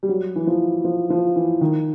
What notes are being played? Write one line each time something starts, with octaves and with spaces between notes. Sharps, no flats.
G3
F#3
E3
F3
F3
F3
E3
D#3